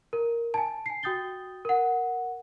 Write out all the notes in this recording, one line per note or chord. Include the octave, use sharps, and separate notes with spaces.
A#4
G#5 A5
G#5 C7
F#4 G5 D#6 G6 A6 G7
A#4 F#5